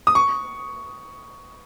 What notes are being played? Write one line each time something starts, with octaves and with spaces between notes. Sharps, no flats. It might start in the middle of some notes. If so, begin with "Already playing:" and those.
D#6
C#6